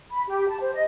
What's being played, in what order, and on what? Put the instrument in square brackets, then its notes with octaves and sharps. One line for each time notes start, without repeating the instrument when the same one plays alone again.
[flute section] B5
G4
A5
C5
D#5